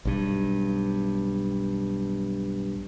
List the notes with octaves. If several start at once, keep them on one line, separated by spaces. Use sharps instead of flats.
B1 G2